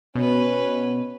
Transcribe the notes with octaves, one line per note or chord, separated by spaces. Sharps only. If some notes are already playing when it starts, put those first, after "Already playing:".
B2 C#4 B4